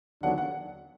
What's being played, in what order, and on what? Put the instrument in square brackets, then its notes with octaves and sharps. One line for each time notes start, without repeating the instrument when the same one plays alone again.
[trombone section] D#2 D3 F#3 B3 D4 [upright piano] F#5
[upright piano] F#5